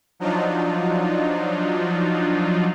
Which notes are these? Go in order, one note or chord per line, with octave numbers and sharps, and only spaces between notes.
F3 F#3 D4 D#4 F4